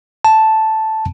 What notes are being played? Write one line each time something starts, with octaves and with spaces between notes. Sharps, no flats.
A5